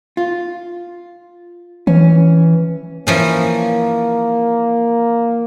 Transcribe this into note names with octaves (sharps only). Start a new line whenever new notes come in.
F4
E3 C#4
E3 F3 A#3 C#4